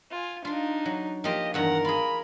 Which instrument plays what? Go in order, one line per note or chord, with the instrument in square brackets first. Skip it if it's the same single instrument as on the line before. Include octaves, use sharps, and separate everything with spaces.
[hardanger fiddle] F4 G#5
[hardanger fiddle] D4 D#4 [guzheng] F4 C6
[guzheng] F#3
[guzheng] F3 A#3 F4 [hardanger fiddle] G4 [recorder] D#5
[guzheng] E2 G2 D#3 [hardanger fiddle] A#4 [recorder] F#5
[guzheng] F4 G#4 [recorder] B5